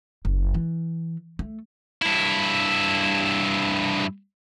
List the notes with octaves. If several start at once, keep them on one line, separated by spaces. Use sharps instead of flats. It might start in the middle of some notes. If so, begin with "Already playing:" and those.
F#1
E3
A3
G2 E4